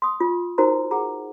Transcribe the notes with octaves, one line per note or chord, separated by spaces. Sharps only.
C6 D#6
F4
D#4 F#4 A#4 C5 A#5
G#4 F#5 A#5